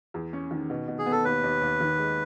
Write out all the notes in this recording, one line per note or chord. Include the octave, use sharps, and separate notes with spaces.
E2
C#4
D#3
B2
B2
G#4
B3
A4
D#2 B4
D#2
D#2
D#3
G#3